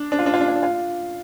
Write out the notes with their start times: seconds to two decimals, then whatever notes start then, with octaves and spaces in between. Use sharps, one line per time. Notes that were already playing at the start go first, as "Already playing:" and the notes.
Already playing: D4
0.12 D4
0.19 F4
0.26 D4
0.34 F4
0.41 D4
0.48 F4
0.56 D4
0.63 F4